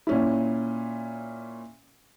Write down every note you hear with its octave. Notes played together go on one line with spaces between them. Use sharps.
A#2 C#4 E4